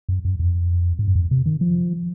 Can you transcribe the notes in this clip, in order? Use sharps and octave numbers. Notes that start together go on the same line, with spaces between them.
F#2
F#2
F2
G#2
F#2
F2
C3
D#3
F3